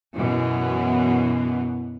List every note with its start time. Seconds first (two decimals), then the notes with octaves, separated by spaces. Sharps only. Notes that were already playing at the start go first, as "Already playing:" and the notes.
0.15 F#2 B2 E3 B3